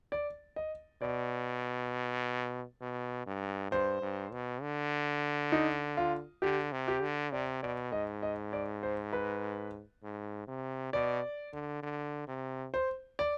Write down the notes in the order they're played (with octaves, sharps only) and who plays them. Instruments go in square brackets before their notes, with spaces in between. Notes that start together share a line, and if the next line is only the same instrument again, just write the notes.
[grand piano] D5
D#5
[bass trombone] B2 [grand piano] D5
[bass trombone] B2
G2
[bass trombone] G2 [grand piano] C5
[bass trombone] G2
B2
D3
[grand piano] D#4
F4
[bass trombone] D3 [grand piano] G4
[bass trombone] C3
[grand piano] G4
[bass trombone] D3
[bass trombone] C3 [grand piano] D5
[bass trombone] B2 [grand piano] D5
[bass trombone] G#2 [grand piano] D#5
[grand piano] D#5
D5
C5
B4
[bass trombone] G#2
C3
[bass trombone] B2 [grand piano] D5
[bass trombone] D3
D3
C3
[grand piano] C5
D5